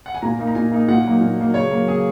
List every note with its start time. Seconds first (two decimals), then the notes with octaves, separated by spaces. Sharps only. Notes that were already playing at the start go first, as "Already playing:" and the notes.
0.06 F#5
0.15 G#5
0.22 A#2 A#5
0.39 A#3 D#4
0.47 A#5
0.55 A#2 G#5
0.72 A#3 D#4
0.88 A#2 F#5
1.05 F#3 A#3 D#4
1.21 A#2
1.38 F#3 A#3 D#4
1.54 C#3 C#5
1.71 F#3 A#3
1.88 C#3 G#4